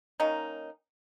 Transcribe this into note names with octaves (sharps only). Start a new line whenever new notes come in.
D#3 A#3 C#4 D#4